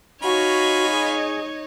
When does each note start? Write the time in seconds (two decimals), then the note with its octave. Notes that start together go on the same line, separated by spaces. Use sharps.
0.23 D#4 F4 F#4 C#5 G#5 B5
0.90 G#4